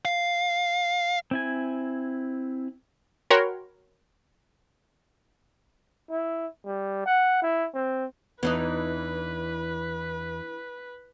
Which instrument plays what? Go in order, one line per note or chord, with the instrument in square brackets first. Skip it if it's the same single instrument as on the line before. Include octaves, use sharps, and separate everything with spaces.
[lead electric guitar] F5
[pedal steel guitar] C4 E4 G#5
[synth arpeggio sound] F#4 A#4 C#5 G5 B5 C6
[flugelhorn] E4
G3
F#5
E4
C4
[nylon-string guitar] E2 [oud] E3 D4 D#4 [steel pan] B3 [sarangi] B4